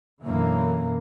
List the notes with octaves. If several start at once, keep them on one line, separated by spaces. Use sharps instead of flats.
F#2 B2 D3 E3 A#3